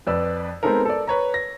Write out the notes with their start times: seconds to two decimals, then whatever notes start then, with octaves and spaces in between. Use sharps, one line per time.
0.07 F2 B4 D5 E6
0.63 G#3 B3 C4 D#4 A4 A#4
0.85 A4 D5
1.07 B4 C#5 A#5
1.34 A#6